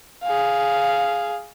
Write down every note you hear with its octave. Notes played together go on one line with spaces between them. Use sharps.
G#4 F5